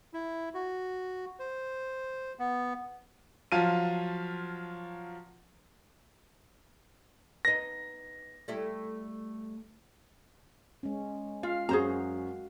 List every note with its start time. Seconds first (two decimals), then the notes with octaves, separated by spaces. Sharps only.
0.13 E4
0.54 F#4
1.39 C5
2.39 B3
3.52 F3 F#3 F4 F5 A5 D#7
7.45 B3 D#4 A#6
8.48 G3 A3 E4
10.83 G#3 C#4
11.43 F4 F5
11.69 F#2 F#4 G#4 C5 A#5